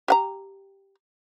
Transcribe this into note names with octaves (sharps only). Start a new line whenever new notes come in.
G4 F#5 A#5